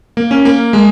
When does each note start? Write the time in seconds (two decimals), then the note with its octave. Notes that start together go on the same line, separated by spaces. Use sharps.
0.17 A#3
0.31 C#4
0.45 A#3
0.73 G#3